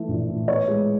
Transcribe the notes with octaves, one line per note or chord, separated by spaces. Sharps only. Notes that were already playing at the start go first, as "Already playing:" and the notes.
Already playing: E3 A3
A#1
A2
B3 C#5
G#3